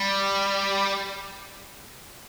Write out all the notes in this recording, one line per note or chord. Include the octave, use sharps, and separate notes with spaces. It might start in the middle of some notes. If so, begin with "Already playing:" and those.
Already playing: G3